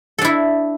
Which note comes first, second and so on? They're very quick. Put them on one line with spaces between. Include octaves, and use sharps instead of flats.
A4 D4 E4